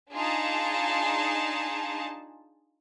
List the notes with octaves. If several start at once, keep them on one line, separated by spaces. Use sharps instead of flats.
D4 D#4 F4 G#4 A5